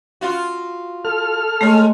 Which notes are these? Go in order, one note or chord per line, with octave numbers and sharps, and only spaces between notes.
F4 F#4
A4 F6
G#3 A3 C#5